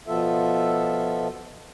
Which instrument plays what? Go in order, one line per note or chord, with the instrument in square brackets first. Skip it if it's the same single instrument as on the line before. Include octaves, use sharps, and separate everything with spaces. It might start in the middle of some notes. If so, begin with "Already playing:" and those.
[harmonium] B2 F3 B3 F4 A4 E5